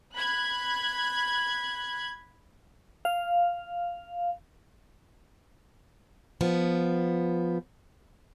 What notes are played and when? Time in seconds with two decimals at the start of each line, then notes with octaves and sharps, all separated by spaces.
0.13 B5 F#6 G#6
3.05 F5
6.41 F3 B3